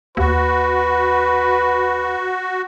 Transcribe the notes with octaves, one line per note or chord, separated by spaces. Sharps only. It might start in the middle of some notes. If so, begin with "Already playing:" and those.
D#2 F#4 B4